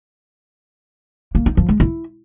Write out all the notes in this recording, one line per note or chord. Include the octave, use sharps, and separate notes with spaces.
A#3
D#4
F3
G#3
E4